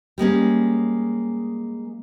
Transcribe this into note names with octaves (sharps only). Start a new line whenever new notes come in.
G3 G#3 A#3 C#4